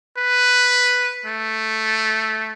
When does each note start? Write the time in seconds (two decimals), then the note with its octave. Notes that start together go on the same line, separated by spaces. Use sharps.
0.18 B4
1.26 A3